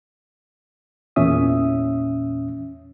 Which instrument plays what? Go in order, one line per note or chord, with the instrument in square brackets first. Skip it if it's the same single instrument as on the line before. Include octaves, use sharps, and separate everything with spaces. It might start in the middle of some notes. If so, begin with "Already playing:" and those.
[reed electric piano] E2 A#2 C#4 E5 D#6